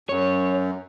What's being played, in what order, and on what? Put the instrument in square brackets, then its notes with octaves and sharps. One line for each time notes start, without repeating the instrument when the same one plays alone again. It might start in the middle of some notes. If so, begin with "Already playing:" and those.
[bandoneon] F#2 [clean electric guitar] C#5